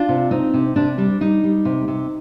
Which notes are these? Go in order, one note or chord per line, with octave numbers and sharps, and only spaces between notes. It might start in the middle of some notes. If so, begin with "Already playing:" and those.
Already playing: D4 F4
C3
C4 D#4
C3
C3 D4
G3 D4
G3 D#4
G3
C3
C3